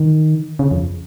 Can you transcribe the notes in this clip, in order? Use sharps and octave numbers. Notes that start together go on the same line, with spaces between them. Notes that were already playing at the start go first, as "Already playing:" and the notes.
Already playing: D#3
C#3
F2